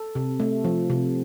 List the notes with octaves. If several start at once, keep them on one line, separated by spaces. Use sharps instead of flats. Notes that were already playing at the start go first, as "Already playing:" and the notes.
Already playing: A4
C3
A3
F3
C3